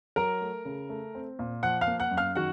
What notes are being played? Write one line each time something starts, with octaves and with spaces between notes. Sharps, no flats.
F#3 A#4 A#5
A3
C#3
A3
C4
A#2
F3 F#5 F#6
F5 F6
A#3
F#5 F#6
F#2
F5 F6
D#3 F#4 F#5